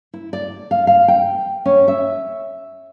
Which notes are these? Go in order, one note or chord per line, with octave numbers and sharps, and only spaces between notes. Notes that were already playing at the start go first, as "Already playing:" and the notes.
E4
D5
F5
F5
G5
C#4
E5